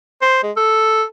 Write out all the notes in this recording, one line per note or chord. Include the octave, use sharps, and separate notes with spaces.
C5
G#3
A4